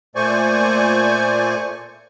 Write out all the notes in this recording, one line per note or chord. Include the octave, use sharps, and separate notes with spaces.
A#2 A3 C5 D5 G#5 C#6